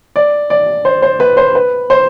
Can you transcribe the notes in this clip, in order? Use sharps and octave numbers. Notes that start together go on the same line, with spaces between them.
D5
D5
C5
C5
B4
C5
B4
C5